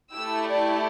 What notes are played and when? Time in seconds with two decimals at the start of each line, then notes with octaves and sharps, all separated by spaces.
0.13 A3 E4 G4 E6
0.46 D5